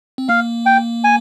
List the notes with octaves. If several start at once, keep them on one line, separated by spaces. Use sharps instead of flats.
C4
A#3 F5
G5
G#5